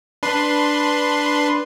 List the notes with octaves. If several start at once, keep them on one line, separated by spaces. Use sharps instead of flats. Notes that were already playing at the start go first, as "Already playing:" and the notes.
D4 B4 C6